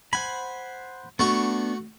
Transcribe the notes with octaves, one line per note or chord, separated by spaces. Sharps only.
C5 F#5 G#5 B5
A3 B3 D4 F#4 C#6